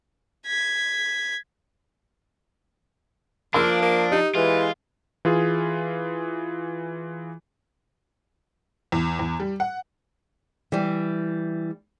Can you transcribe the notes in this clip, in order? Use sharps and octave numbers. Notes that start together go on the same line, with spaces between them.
G#6 B6
F3 A#3 D4 C6 E6
A#3
D#4 G4
E3 G#3 F4
E3 F4 G#4
E2
E2
G3
F#5
E3 G3